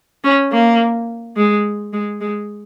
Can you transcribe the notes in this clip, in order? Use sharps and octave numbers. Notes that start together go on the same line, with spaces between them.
C#4
A#3
G#3
G#3
G#3